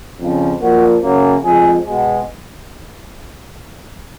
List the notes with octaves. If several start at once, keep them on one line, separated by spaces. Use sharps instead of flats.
F2 C#3 F3
A#2 F3 A#3 F#4
F#2 C#3 F#3 A#3
F2 F3 G#3 G#4
B2 G#3